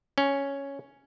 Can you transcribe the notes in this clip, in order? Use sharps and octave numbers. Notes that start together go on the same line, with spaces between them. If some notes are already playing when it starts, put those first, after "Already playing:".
C#4